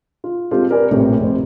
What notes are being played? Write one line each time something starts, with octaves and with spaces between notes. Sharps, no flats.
F4
G#3 C4 F4 G4 A4
G4 A#4 B4 D5 G#5
A#1 A2 C3
F1 C5